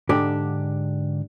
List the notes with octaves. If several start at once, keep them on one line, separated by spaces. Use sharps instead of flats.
G#2 D3 D4 G4